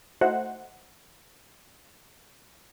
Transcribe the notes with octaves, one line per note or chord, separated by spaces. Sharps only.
A3 D#4 E4 F#4 C5 F#5